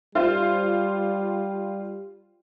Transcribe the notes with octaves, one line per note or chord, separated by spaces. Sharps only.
G3 F4 C5